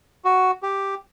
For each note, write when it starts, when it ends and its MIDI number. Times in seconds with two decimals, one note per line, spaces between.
0.25 0.51 66
0.63 0.95 67